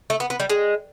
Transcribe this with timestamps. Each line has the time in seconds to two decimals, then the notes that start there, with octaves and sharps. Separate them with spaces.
0.10 A3
0.20 B3
0.30 B3
0.40 G3
0.50 G#3